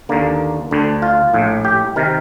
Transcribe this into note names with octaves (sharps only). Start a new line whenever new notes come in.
D#2 D3 A#3
D2 D3
F4
A#1 A2
G4
C3 D#3 A#4